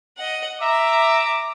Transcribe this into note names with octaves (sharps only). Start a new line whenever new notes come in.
D#5 F#5
E5 A#5 D6